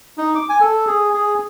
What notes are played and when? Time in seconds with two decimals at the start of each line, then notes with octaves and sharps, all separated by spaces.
0.18 D#4
0.35 D6
0.49 G#5
0.61 A4
0.87 G#4
1.13 G#4